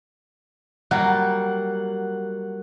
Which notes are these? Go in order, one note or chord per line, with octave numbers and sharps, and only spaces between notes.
F#3 G3 A#3 F#5